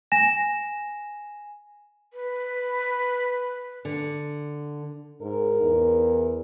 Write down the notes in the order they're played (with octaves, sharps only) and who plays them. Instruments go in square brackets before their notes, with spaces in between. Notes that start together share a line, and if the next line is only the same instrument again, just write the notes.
[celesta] G#5 A#6 E7
[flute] B4
[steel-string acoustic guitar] D3
[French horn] G#2 [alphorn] A#4
[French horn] E2